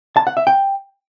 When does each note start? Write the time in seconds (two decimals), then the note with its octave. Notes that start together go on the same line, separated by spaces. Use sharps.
0.17 A5
0.27 F#5
0.37 E5
0.47 G5